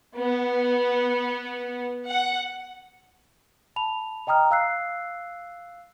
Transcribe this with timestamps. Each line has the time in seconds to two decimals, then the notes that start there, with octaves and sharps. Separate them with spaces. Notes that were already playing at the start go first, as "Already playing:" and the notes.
0.17 B3
2.07 F#5
3.76 A5 B5 F7
4.27 D#5 G5 A#5 D#6 F6
4.51 F5 E6 F#6 C7